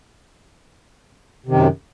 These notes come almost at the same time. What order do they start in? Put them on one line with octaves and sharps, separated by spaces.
C3 D#3 F#2